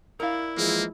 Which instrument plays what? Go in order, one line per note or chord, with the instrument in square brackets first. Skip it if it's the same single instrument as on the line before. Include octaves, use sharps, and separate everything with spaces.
[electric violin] E4 [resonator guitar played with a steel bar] A#4 D5 F5
[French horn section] E3 F3 G#3 [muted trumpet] A#3